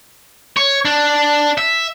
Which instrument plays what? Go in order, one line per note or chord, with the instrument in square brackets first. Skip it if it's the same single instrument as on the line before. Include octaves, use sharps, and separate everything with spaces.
[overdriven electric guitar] C#5
D4
E5